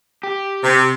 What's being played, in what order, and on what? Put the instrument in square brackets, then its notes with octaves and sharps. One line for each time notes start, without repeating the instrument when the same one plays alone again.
[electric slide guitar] G4
[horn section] C3